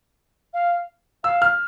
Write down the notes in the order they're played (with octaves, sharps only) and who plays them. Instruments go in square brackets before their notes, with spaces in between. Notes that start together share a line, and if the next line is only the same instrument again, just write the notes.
[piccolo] F5
[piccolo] F5 [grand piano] E6
[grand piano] F6